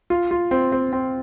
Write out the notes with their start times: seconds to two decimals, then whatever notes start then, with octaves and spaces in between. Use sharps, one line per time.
0.10 F4
0.31 F4
0.51 C4
0.72 C4
0.93 C4